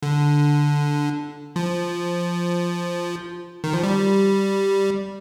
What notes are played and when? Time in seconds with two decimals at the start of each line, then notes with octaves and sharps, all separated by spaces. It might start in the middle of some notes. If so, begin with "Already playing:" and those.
0.03 D3
1.56 F3
3.64 D#3
3.73 F3
3.83 G3